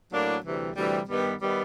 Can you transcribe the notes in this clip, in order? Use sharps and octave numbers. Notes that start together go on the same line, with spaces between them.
A2 F#3 A#3 D4
D2 C3 E3 G3
D2 C3 E3 G3
G2 D#3 G3 B3
D#3 G3 B3